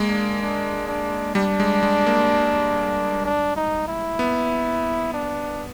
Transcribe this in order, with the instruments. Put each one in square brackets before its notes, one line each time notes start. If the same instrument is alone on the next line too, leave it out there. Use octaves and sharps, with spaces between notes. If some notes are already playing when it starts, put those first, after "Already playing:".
Already playing: [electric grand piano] G#3 A#3
[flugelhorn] D4
D4
D4
[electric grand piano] G3 [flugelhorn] D4
[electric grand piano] G#3
G#3
A#3
[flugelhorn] D4
D#4
E4
[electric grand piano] B3
[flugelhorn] D4